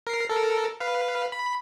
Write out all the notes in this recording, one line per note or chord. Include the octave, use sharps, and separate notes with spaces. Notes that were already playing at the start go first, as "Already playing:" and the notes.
A#4 C7
A4 A#4
B4 F5
B5